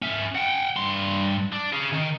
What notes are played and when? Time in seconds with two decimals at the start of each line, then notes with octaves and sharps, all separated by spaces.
0.02 C#4 E5
0.35 F#5 G5
0.76 G2 C6
1.53 D4
1.72 C#4 G#4
1.92 D#3